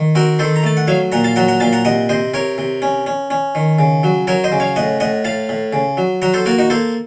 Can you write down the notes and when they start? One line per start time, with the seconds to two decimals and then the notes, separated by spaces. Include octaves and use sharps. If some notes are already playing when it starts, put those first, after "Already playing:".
Already playing: D#3
0.15 C4 F#4 A#4
0.39 D#3 A4 C5
0.56 A#5
0.63 A3 A5
0.77 F#5
0.87 F#3 C#5 F5
1.12 A#2 F#5 A#5
1.24 F5 A5
1.36 F#3 F#5 A#5
1.48 F#5 A#5
1.60 A#2 F5 A5
1.73 F#5 A#5
1.85 C3 D#5 F#5
2.09 C3 C5 D#5
2.34 C3 A#4 C#5
2.58 C3
2.82 C#4
3.06 C#4
3.30 C#4
3.55 D#3
3.79 C#3
4.03 F#3
4.27 F#3 A#4 C#5
4.44 C5 D#5
4.52 C#3
4.60 C#5 F5
4.76 A2 D#5 F#5
5.00 A2 D#5 F#5
5.24 A2 F5 A5
5.49 A2
5.73 C#3
5.97 F#3
6.22 F#3 F#5 A#5
6.34 A4 C5
6.46 A#3 F#4 A#4
6.58 D#4 F#4
6.70 A#3 A4 C5